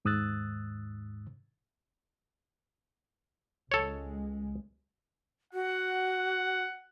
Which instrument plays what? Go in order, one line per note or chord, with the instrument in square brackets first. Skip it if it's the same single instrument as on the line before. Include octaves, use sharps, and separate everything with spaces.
[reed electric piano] D#2 G#2 D#6 E6 F#6 A6
[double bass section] C#2 G#3 [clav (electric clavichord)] A4 C#5
[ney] F#4 [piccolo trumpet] F#5